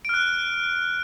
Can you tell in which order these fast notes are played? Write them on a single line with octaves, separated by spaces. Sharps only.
D7 F6 F#6